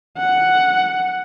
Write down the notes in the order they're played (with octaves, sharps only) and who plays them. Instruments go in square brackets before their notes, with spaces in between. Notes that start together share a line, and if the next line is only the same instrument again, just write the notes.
[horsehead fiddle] F#5